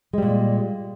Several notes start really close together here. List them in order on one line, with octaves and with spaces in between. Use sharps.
G#3 G3 A#2